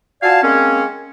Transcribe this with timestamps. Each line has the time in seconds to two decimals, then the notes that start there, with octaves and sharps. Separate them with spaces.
0.23 F4 F#4 D5 F5 G#5 A5
0.43 G#3 A#3 C4 C#4